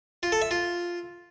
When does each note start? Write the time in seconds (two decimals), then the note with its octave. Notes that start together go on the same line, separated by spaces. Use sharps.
0.23 F4
0.32 A4
0.42 E5
0.51 F4